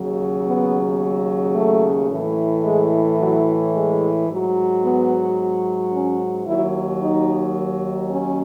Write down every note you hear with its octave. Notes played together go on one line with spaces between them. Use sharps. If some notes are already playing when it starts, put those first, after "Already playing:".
Already playing: D#2 C#3 F#3
B3
A3
A2 E3
G#3
F#3
G#3
G#2 F#3
B3
C#4
D#2 D#3 F#3 E4
D#4
C#4